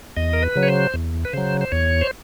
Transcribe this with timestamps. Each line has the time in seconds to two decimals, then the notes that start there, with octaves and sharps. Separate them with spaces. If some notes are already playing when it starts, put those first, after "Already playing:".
0.16 E2 D#5
0.33 A#4
0.43 B4
0.56 C#3 F#3
0.63 C#5
0.68 C5
0.94 E2
1.25 B4
1.33 C#3 F#3 C5
1.61 C5
1.72 E2 C#5
2.01 C5